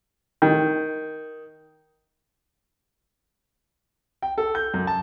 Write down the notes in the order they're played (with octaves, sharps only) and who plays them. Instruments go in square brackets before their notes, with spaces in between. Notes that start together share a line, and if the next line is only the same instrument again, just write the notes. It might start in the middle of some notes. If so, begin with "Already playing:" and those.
[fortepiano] D#3
[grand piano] G5
A4
G6
F#2
A5